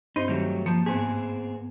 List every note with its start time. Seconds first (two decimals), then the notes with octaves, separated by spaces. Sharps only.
0.16 G2 C4 D#4 C5
0.28 D#3 F#3 G3 A3
0.66 F3 A#3 A5 G6
0.86 G#2 B3 C4 G#4